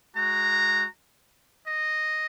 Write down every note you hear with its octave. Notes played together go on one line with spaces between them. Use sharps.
G#3 F#4 A#5
D#5